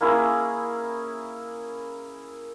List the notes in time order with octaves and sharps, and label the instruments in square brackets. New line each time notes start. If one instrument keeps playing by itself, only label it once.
[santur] A#3 C#4 E4 G#4